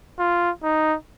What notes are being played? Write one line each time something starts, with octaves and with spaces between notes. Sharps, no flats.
F4
D#4